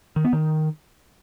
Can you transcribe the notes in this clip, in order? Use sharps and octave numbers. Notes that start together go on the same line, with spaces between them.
D#3
B3
D#3